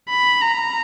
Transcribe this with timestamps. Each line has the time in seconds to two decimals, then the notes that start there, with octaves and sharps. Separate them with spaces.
0.10 B5
0.41 A#5